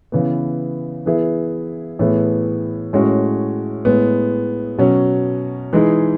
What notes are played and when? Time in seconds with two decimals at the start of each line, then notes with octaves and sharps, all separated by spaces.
0.12 C#3 E3 B3
1.06 E3 B3 E4 G#4
1.99 A2 E3 B3 E4 G#4
2.93 A2 G#3 C#4 F#4
3.85 A2 G#3 B3
4.78 B2 F#3 C#4
5.73 E3 G#3 D#4 G#4